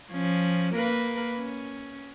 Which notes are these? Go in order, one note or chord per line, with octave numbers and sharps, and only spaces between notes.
F3 C#4
A#3 A#4 B4
C#4